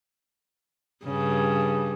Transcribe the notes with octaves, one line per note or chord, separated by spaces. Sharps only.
G2 C#3